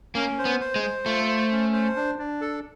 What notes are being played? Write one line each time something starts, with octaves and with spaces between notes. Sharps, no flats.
A#3 C#4
C5
B3
C5
G#3
C5
A3 F4
C5
C#4
C5
D4
D4
A4